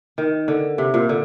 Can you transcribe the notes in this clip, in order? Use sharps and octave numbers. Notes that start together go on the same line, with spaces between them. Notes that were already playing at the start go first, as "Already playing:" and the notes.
D#3
D3
C3
A#2
D3